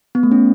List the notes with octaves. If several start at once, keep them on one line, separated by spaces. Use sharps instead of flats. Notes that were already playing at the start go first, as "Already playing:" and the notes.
B3
A3
C#4